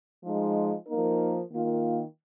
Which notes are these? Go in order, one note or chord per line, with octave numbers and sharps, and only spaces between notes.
F3 G#3 D#4
F3 A#3 D#4 A#4
D#3 A#3 F4